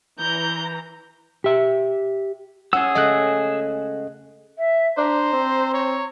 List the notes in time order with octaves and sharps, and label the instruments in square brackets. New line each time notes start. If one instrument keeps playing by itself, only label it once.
[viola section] E3 A#5 [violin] G6
[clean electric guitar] G4 E5
[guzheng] C#4 A5 [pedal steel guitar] G#4 E6 [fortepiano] F#5
[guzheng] C#3 G#3 A3 [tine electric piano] D#5 F#6
[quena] E5
[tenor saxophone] D4 [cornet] C5 [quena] A#5
[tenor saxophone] C4
[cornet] C#5